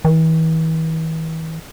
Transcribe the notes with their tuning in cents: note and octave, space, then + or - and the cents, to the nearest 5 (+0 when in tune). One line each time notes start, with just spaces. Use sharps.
E3 -40